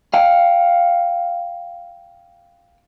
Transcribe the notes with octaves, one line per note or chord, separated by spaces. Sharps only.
F5 G5